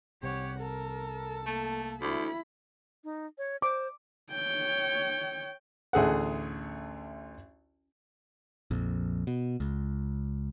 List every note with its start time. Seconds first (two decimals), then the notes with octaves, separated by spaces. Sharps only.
0.23 C2 C3 G4 C#5 F#5
0.60 A4 A#4
1.46 A3 A#3
2.01 D2 E4 B5
3.04 D#4
3.38 C#5
3.62 C5 D6
4.32 C#5 G5
5.93 A1 D2 G#4 A4 F#5
8.71 A#1 F2
9.27 B2
9.60 C#2